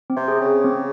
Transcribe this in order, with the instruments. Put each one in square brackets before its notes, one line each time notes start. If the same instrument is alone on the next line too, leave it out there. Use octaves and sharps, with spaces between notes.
[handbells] C4
[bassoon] C3
[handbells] G#4
[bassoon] C#3
[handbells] G#4
C4